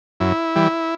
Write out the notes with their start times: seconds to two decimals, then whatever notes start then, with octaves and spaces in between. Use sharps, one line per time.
0.20 F#2 E4
0.56 E3 G3